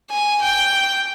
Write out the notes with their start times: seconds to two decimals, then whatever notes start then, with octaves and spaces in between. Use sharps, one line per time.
0.11 G#5
0.41 G5